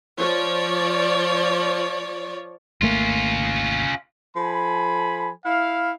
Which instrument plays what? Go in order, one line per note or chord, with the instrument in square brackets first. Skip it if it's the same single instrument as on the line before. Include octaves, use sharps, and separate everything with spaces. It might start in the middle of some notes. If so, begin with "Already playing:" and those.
[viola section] F3 C#5 D5
[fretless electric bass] G#1 A3 A#3 [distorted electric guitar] C#4 F4
[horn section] F3 A4 G#5 B5
E4 F5